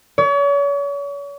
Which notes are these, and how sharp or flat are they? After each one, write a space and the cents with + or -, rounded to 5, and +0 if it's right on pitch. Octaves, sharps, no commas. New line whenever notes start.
C#5 +40